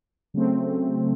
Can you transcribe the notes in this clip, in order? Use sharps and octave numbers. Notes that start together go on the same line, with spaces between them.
C#3 F#3 A3 C4